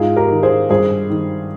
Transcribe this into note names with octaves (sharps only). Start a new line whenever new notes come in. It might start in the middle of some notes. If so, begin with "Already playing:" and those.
Already playing: G#2 F4 G#4
G4 A#4
D#3
G#4 C5
G2 G#4 C5
D#3